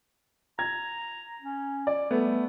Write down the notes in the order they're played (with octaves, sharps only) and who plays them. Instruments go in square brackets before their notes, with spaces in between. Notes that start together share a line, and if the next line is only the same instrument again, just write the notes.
[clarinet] A#5 [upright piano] G#6
[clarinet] C#4
[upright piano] D5
[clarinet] G3 [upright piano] A3 B3